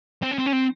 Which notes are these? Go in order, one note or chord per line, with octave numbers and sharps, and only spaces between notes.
C4
C#4
C4
C#4
C4